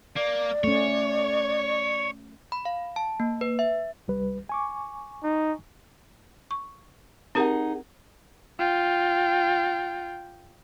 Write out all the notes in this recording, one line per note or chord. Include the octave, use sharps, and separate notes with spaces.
A#3 D5
A3 C#4 C#5
B5
F5
A5
A#3
B4
E5
C2 G3 B4
G#5 C#6 D6
D#4
C#6
C4 D#4 G4 G#4 A#4 F#5
F4 G5